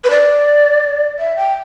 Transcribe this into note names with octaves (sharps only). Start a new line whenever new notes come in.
B4
D5
E5
G5